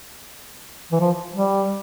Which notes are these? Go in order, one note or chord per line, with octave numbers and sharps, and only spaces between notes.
E3
F3
G3